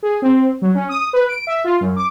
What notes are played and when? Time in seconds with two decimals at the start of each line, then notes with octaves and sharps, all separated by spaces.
0.03 G#4
0.22 C4
0.62 F#3
0.75 C#4
0.89 D#6
1.13 B4
1.29 D7
1.47 E5
1.64 F4
1.81 F#2
1.96 D6